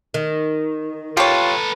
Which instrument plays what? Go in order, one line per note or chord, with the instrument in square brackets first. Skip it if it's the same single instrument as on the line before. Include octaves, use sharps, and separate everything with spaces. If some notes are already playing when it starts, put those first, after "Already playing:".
[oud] D#3
[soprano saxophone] F4 [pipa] G4 C#5 [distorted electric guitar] A4 B4